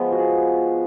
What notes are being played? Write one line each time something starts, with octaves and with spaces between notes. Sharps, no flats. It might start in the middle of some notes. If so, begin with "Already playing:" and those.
Already playing: F3 G#3 B3
F#4
G#4